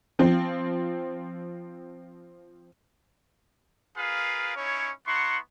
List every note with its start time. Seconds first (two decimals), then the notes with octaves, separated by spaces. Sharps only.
0.19 F3 C4
3.97 F4 G#4 A#4 B4 F5
4.56 C#4 D#4 E4 C#5
5.06 B3 E4 F#5 A#5 C6 C#6